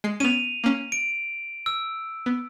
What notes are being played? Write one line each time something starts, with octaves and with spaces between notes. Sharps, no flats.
G#3 C7
B3 C#4 D#7 F7
A#3 C#4
D7
E6
B3